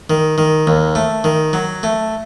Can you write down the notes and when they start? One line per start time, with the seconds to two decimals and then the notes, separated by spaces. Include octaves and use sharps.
0.10 D#3
0.38 D#3
0.67 D#2
0.95 A3
1.24 D#3
1.53 F#3
1.83 A3